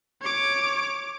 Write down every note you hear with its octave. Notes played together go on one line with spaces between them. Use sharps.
C#5 D6